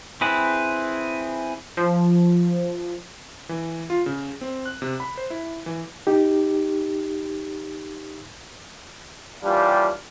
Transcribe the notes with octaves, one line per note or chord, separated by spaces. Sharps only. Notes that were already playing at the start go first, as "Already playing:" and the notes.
C4 E4 G#4 B4
F3
E3
F4
C#3
C4
F#6
C3
B5
C5
E4
E3
D#4 G4
D#2 E3 G3 D4 F4 G4